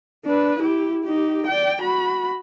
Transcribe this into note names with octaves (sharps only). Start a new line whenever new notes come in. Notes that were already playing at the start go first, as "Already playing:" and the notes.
D4 B4
E4 G4
D#4 G4
D5 G5
F#4 B5